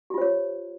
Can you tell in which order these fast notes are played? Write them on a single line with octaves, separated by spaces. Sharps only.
G4 F4 C5 C#5